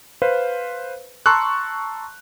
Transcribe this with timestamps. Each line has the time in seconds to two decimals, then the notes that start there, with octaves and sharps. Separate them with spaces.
0.22 B4 C5 F5
1.26 A5 A#5 C6 C#6 E6 F#6